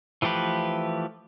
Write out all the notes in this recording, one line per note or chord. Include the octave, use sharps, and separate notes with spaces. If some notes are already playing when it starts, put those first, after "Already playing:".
E3 F3 A3 G4 B4